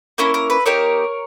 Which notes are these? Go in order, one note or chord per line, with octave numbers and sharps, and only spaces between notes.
A#3 C#4 E4 A#4
A#4
B4
A#3 D#4 G4 A#4 C#5